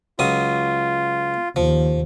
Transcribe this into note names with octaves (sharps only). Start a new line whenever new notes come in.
C#2 F#3 F4 D#6
D#2 F3